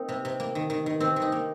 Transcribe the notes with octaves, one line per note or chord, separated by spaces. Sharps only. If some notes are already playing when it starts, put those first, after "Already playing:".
Already playing: A#3 C4 D#4
C3
C3
A#3
D#3
D#3
D#3
D#3 C4
D#3
D#4
A#3